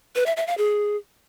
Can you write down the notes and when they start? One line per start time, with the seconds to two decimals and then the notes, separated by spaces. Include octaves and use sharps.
0.16 B4
0.26 E5
0.37 E5
0.47 F5
0.58 G#4